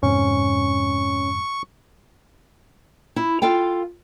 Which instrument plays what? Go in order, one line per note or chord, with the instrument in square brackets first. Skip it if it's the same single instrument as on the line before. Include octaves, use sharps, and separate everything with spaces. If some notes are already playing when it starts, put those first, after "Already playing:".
[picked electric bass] F2 G#2 C3 [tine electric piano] C#4 [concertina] C#6
[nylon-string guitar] E4
F4 A4 F5 G5